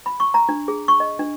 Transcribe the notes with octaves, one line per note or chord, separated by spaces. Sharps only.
B5
C#6
A#5
D4
G#4
C#6
D#5
D4